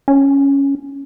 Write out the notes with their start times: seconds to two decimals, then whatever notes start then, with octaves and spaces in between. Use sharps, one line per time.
0.08 C#4